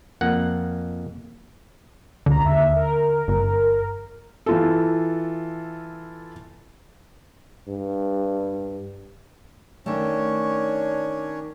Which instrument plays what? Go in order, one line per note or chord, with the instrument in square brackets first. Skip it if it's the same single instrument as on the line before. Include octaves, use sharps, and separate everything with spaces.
[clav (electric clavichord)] F2 A#3 F#5
[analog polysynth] C#2 A#5 [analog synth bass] D3
[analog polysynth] D#2 E5
A#4
[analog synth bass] G1
[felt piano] E3 F4 A4
[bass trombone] G2
[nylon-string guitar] D#3 A3 [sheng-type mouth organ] C#4 D4 C#5